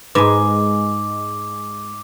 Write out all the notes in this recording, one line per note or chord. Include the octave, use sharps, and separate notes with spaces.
G#2 G#3 B4 D6